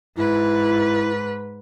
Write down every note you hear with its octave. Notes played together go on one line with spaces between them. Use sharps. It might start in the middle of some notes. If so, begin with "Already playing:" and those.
G#2 E4 B4